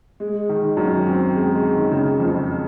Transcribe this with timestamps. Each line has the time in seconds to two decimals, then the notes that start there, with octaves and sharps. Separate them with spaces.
0.20 G#3
0.49 D#3
0.77 F#2
1.06 C4
1.35 G#3
1.63 D#3
1.91 C#3
2.20 F2